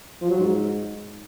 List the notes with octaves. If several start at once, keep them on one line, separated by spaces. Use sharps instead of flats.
F3
F#3
G#2